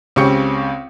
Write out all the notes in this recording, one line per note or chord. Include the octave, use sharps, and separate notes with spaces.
C#2 C#3 C4 G4 C#6 C#7